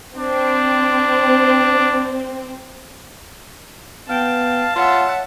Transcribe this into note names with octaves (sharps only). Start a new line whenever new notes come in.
C4 D4
B3 F5 G5 A5
F4 C#5 E5 F#5